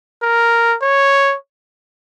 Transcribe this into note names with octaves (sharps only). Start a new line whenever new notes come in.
A#4
C#5